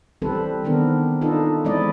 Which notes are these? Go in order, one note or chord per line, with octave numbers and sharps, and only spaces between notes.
E3 G3 C4 A4 B4 C5
D#3 B3 C4 D4 A#4
D4 D#4 F4 A4 B4
E3 G#3 C4 E4 D5 D#5